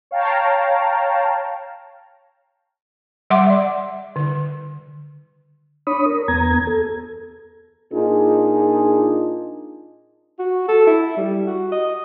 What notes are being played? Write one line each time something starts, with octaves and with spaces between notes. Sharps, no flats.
C#5 F5 G5 A5 A#5
G3 E5 F#5 C6 D6
D5
D3
D4 C#5 B5 D#6
A#4
E2 B3 A#5 G#6
A4
A#2 D4 D#4 F4 G#4
F#4
A4
E4
G3
F#4
D#5